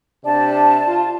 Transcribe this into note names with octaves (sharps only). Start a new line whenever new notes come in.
C3 D4 D5 A5
F4